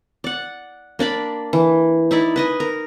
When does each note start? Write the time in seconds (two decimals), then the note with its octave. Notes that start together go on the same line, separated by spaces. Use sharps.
0.24 D5 F#5
0.99 A#3 D4 D5 B5
1.53 E3
2.11 D#4 E4 D5
2.36 B4 D#5 G#5
2.60 A#4